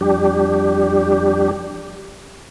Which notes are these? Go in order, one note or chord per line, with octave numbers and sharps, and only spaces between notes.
F2 G3 D4 G4